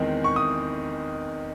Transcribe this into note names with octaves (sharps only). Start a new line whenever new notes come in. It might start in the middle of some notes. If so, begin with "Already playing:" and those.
Already playing: E2 D#3 G#3 C4 D#4
C#6
D#6